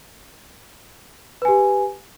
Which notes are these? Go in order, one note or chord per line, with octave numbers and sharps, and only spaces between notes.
G4 B4 G#5